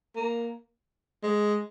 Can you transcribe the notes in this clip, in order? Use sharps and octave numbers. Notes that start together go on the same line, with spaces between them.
A#3
G#3